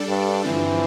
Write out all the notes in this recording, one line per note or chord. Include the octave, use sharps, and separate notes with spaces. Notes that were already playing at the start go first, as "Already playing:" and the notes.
Already playing: G3 D4 A4 D5
G2
G2 D3 E3 F3 C4